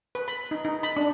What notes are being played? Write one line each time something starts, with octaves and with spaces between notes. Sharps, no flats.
B4
B5
D#4
D#4
B5
D4